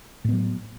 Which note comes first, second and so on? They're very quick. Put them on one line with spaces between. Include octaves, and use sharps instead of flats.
A2 B3 F#3